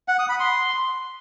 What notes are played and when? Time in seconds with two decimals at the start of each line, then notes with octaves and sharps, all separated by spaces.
0.08 F#5
0.19 D#6
0.29 B5
0.40 C6